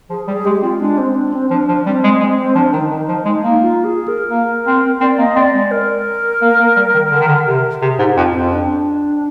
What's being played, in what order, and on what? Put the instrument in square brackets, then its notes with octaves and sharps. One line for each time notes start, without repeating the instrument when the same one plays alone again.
[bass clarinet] F3 [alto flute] G#4
[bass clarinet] G3 [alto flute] G#4
[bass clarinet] G#3 [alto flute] G4
[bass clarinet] C4 [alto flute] F4
[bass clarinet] G#3 [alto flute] D4
[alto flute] C4
D4
C4
[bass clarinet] F3 [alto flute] D4
[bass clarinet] F3
[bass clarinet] G3 [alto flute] C4
[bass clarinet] G#3
[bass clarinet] G#3 [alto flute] C4
[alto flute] C4
[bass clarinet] F3 [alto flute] D4
[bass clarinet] D#3 [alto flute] D#4
[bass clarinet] D#3
F3
G#3
A#3
[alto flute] F4
G#4
A#4
[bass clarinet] A#3
C4
[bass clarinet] C4 [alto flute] D5
[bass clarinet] A#3 [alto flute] D#5
[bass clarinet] C4 [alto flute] D5
[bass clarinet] G#3 [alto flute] D5
[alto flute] A#4
[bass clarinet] A#3
A#3
G3
D#3
D3
D#3
D3
C3
[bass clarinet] C3 [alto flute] G#4
[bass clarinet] G#2 [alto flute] G4
[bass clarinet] F2 [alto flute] F4
[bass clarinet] F2 [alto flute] C4
[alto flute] D4